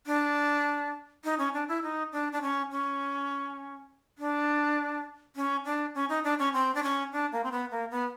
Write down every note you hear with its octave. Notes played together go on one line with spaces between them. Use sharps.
D4
D#4
C#4
D4
E4
D#4
D4
D4
C#4
C#4
D4
C#4
D4
C#4
D#4
D4
C#4
C4
D4
C#4
D4
A#3
C4
B3
A#3
B3